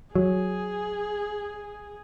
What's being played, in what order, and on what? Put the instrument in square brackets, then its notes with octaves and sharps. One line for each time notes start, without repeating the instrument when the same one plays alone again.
[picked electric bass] F#3 [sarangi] G#4